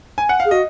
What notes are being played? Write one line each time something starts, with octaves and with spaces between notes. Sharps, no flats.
G#5
F#5
F5
G#4
F#4 D#5